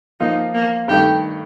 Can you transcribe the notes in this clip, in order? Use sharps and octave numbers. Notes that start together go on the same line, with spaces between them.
F3 A#3 D#4 F4
A#3
G2 D#3 A3 D#4 G4